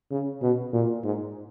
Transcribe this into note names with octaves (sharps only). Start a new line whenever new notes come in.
C#3
B2
A#2
G#2